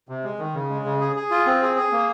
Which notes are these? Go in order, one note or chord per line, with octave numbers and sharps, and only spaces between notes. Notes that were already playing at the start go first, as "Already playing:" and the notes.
C3
G#3
D#3
C#3
G#3
C#3
G#4
G#4
F4
C4
G#4
G#4
A#3